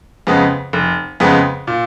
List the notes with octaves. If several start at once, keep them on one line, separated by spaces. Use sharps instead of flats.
F2 C#3 G#3 B3
F1
F2 C#3 G#3 B3
A#2